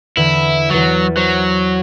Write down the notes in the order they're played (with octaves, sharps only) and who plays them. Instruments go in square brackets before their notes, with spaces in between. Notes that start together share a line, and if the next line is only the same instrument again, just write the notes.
[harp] E2 D3 [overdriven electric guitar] E4
[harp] E2 A6 [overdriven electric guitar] F#3
[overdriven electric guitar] F#3 [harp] C5